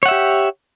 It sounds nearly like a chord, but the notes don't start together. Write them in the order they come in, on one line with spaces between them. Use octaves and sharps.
C#5 F#5 E5 G4